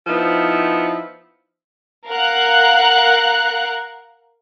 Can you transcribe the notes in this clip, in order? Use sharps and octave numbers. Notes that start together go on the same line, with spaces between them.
F3 B3 D#4 E4 C5
A#4 F5 F#5 F#6